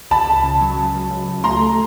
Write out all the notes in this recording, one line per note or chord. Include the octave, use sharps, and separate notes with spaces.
C#2 A5 B5
C#2
C#3
F#3
C#3
C#2
C#2
C#2
A3 A#5 C6
A3